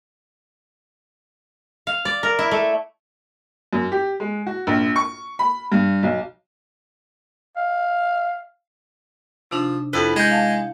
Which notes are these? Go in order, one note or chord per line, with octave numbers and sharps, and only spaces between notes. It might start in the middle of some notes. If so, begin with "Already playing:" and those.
F5
D5
A#4
E4
A3
F#2
G4
G#3
F#4
A#1
C#6
B5
G2
B1
F5
C3 F3 D4 D#4
F2 E4 B4 E6
G#3 F#5 G6
F5 A5